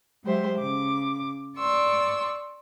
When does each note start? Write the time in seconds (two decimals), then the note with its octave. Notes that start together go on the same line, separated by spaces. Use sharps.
0.23 F#3 G#3 G4 C5 E5
0.58 C#3 D6
1.58 D5 C6 C#6 E6